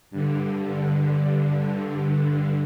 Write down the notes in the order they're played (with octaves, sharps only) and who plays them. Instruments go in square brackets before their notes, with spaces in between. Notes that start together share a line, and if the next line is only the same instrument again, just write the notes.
[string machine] G2 D3